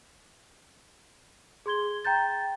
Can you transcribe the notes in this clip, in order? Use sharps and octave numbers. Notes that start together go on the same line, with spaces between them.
G#4 C6 G#6 G7
G5 A#5 G6 A6